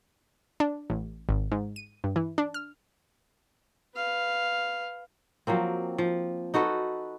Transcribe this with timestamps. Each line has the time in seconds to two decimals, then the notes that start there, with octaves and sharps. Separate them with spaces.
0.60 D4
0.90 A1
1.29 G#1
1.51 G#2
1.76 D#7
2.04 G2
2.16 E3
2.38 D4
2.54 F6
3.95 B4 F5
5.47 F3 F#3 A#3 C4
5.98 F3
6.54 D#4 F#4 A4 B4